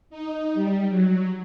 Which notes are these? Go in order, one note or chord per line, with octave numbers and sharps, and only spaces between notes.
D#4
G3
F#3